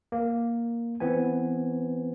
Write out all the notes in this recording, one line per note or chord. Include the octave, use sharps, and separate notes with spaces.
A#3
E3 B3 C4 G#5